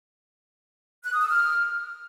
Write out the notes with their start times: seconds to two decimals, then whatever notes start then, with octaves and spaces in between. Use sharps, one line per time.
1.05 F#6
1.13 D#6
1.21 E6
1.30 F6